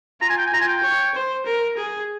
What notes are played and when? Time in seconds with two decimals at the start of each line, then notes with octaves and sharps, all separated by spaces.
0.21 F4 A#5
0.30 G#5
0.38 G5
0.46 G#5
0.53 F4 A#5
0.61 G#5
0.68 G5
0.83 C#5
1.15 C5
1.46 A#4
1.77 G#4